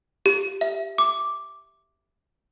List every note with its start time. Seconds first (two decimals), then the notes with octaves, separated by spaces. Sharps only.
0.26 G4
0.61 E5
0.98 D6